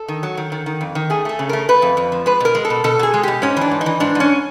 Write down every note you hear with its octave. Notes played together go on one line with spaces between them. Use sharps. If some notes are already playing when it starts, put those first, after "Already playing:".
Already playing: A4
D#3
F#3
D#3
D#3
D#3
F2
D#3
A3 G#4
A3 A4
C#3
A3 A#4
A3 B4
F2
F2
F3
G#3 B4
B2 A#4
G#3
A4
B2
B2 A4
B2 G#4
G#3
B2 G4
G#2 C#4
E3 D4
G#2
D#4
E3
G#2 D4
G#2 C#4